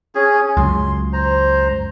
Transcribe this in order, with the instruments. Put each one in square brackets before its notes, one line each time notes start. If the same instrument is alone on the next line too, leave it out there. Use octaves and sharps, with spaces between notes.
[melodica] C#4 G#4 G#5
[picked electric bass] C#2 F#2 [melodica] C6
[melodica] C5 A#5